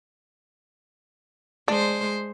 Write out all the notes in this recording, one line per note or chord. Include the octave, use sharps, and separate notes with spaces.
G#3 D4 C5